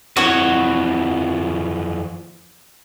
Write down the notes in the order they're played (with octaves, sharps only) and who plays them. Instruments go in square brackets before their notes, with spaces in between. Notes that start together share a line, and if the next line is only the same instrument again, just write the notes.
[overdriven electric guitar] F2 E3 [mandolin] F#4 C#5